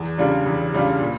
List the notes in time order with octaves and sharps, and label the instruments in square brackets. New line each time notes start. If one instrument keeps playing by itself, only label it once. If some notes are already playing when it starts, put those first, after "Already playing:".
Already playing: [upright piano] E2
C#3 G3 D4 F4
E2
C#3 G3 D4 F4
A#2